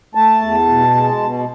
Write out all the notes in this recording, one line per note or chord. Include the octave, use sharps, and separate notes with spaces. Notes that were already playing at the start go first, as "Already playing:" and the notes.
A3 A5
E2
B2
G#3
B2